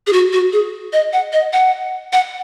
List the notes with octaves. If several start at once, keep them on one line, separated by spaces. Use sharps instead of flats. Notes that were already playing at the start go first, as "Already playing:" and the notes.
G#4
F#4
F#4
G#4
D#5
F#5
D#5
F#5
F#5